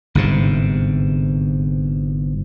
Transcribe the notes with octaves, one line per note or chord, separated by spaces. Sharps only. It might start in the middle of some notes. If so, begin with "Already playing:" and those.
G1 G#2 C3